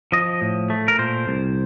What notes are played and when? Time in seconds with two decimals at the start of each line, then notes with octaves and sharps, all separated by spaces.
0.12 F3 D#5
0.41 A2
0.70 A3
0.88 A#4
0.99 A#2 C5
1.27 C2